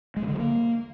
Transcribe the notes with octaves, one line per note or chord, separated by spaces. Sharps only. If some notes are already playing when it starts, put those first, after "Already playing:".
G#3
C3
D3
F#3
A#3